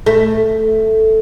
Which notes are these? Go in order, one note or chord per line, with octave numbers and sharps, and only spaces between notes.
A3